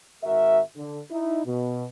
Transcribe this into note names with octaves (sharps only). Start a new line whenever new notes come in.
G#1 G#3 F#4 A#4 E5
D3
D#4 E4
B2